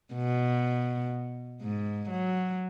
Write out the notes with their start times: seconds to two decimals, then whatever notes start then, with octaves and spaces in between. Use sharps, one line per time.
0.14 B2
1.62 G#2
2.10 F#3